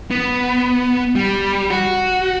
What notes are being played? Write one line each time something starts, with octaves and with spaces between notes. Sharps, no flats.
B3
G3
F#4